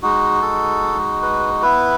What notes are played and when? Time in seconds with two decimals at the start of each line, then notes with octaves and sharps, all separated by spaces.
0.03 G#3 D#4 F#4
0.42 A4
1.22 B4
1.62 B3 E4 B4